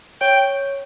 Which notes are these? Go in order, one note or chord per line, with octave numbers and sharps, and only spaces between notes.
C#5 G5